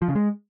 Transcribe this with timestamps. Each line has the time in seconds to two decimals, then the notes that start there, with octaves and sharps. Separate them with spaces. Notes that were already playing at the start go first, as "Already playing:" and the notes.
0.02 F3
0.08 C#3
0.15 G#3